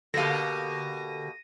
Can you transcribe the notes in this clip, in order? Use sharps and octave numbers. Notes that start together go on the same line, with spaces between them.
B2 D3 A#3 G4 A4 F5 A#6 D#7